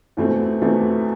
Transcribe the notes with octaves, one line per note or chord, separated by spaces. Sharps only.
E2 B2 A3 C4
E2 B2 A3 C4